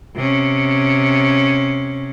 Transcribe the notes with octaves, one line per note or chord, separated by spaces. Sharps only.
C3 C#4